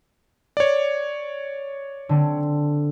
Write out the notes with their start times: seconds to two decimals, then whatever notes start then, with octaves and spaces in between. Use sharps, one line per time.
0.57 C#5 D5
2.09 D3 C4